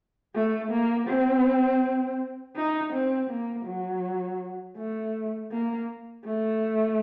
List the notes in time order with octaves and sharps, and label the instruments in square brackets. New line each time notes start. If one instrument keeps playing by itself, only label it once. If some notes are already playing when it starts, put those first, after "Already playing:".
[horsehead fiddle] A3
A#3
C4
D#4
C4
A#3
F#3
A3
A#3
A3